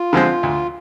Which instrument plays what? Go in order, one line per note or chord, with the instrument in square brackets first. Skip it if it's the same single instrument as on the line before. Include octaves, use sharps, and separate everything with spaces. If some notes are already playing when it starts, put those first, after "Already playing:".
Already playing: [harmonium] F4
[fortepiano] D3 F3 G#3 C4
D2